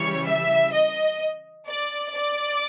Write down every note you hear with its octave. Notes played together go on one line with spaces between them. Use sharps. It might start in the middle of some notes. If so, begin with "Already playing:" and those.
Already playing: C#3 E3 G3 C#5
E5
D#5
D5
D5